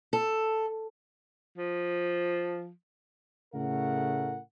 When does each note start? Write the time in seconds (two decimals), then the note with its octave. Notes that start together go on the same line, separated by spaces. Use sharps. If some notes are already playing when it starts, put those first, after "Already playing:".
0.13 A4
1.58 F3
3.54 A2 C#3 A3 A#4 F#5